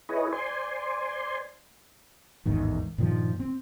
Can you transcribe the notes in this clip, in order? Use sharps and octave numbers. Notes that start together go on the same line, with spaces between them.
E4 G#4 B4 C#5 D#5
C5 D5 G#5 C6
A1 E2 G#2 D#3
G2 A#2 D#3 F3
C4